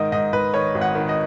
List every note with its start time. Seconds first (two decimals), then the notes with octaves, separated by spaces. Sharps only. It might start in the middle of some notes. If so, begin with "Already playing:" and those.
Already playing: G#2 D#3 D#5
0.12 G#2 D#5
0.33 G#2 B4
0.54 D#3 C#5
0.74 G#1
0.81 F#5
0.95 D#3
1.09 D#5